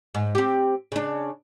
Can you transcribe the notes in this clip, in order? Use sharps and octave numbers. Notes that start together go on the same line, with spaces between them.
G#2
C4 G4
C#3 D4